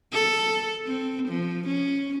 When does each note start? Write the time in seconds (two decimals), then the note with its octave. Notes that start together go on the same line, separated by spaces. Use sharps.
0.12 A4
0.86 C4
1.28 F3
1.67 C#4